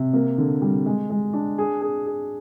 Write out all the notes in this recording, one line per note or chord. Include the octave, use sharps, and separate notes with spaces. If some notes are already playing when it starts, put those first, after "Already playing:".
Already playing: C3
A#3
D3
G3
G#3
G#3
D4
G#4
G#4
G#4